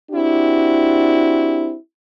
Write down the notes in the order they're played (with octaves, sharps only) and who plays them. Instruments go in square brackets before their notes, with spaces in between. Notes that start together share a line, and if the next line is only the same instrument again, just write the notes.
[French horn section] C4 D4 E4 F#4 G4